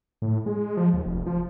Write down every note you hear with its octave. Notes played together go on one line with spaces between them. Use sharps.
A2
G#3
F3
D#2
F1
F3